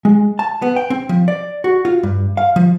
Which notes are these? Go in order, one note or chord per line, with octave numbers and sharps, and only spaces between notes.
G#3
A5
B3
G5
C4
F3
D5
F#4
F4
G2
F5
F3